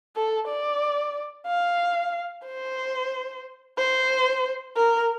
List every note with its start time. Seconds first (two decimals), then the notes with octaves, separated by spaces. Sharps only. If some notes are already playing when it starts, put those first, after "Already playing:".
0.16 A4
0.48 D5
1.47 F5
2.46 C5
3.78 C5
4.77 A#4